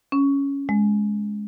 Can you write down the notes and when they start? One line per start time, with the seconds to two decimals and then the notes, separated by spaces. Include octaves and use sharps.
0.12 C#4
0.69 G#3